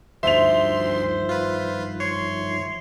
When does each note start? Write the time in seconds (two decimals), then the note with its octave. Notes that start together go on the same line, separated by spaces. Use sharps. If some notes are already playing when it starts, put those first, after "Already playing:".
0.23 D2 G2 D#3 F3 C5 E5 C6 F7
1.29 F4 B4
2.00 C#5 C6